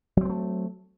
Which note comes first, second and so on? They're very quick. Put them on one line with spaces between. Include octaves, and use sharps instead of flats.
F#3 C4 G#3 A3